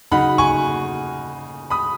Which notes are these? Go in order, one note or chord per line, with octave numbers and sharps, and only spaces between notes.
C#3 F#3 D#4 F#5 B5
G#5 C#6
B5 D#6